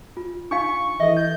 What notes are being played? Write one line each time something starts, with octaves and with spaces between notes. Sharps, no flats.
F4
D4 D#4 F5 C#6
E3 A4 D#5 E5
D#5 G6